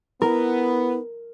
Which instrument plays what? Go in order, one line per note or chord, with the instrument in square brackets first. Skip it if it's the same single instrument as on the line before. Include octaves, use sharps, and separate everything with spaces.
[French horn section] B3 [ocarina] E4 [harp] A#4